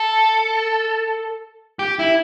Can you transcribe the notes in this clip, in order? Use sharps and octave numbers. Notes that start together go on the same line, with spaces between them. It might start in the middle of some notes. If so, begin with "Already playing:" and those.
Already playing: A4
G4
E4